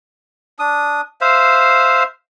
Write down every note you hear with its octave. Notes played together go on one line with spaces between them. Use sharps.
D4 D#6
C5 E5 F5